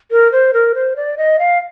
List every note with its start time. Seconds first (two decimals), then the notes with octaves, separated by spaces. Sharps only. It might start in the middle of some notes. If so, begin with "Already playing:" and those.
0.11 A#4
0.32 C5
0.53 A#4
0.75 C5
0.96 D5
1.18 D#5
1.39 F5